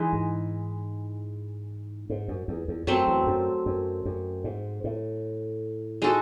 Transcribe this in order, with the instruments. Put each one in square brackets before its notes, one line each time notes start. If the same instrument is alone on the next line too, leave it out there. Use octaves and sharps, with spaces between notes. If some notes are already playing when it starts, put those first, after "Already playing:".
Already playing: [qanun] E3 G#3 D#4
[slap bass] G#2
G#2
F#2
E2
E2
[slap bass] F#2 [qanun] F#3 A3 C4
[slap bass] E2
F#2
F#2
F#2
G#2
A2
[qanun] G#3 D#4 F#4 A4